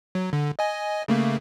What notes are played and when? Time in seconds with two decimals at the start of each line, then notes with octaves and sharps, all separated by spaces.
0.15 F#3
0.33 D3
0.59 D#5 G#5
1.08 C#3 A3 A#3